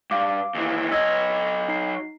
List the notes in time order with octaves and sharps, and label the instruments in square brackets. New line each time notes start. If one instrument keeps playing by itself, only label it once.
[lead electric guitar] G2 [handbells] F5 D6
[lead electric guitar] D#2 E3
[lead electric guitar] F#3 D#5 [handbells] E6 G#6 A#6
[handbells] D#4 C7